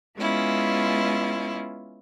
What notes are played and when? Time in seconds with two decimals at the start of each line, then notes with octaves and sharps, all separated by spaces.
0.17 G#3 B3 C#4 E4 F4